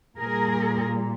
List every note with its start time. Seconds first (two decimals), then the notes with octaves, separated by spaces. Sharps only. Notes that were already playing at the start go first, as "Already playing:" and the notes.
0.18 A#2 G3 A#3 G#4 A#4